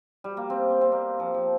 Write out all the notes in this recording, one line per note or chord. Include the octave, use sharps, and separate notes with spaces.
G3
A#3
C4
C4
C4
A#3
F3
F3